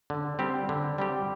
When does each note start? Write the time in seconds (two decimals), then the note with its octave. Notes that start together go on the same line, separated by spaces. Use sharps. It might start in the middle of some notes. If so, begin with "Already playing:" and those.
0.10 D3
0.39 G3 C4 G4
0.69 D3
0.98 G3 C4 G4